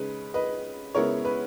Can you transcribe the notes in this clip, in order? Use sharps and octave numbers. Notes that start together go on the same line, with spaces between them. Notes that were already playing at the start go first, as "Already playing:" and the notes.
Already playing: C#3 G#3 D#4 B4
B4 D#5
C#3 G#3 B3 E4 A#4 C#5
B4